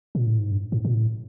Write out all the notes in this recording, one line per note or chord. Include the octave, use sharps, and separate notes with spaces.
A#2
A2
G#2
G2
G#2
A#2
A2